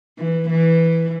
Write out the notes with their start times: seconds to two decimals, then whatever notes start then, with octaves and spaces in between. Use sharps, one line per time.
0.18 E3
0.50 E3